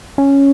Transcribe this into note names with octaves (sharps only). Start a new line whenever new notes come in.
C#4